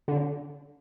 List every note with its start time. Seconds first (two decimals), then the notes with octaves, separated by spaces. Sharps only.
0.08 D3